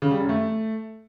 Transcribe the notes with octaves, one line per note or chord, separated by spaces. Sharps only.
C#3
G3
F#2
A3